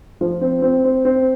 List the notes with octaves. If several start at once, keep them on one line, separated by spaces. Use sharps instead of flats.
F3
C4
C4
C4
C4